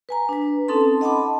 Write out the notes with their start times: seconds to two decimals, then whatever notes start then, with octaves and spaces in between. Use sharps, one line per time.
0.09 B4 G#5 A#5
0.29 D4 B4
0.68 C4 C#4 D#4 A4 A5 C6
1.01 D#5 F#5 A5 B5 D6